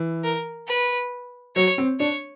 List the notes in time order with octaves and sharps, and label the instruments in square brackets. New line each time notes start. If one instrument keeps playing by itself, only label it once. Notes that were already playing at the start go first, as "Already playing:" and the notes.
Already playing: [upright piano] E3
[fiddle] A#4
B4
[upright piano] F#3 [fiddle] C#5
[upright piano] C4
[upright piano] D4 [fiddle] C#5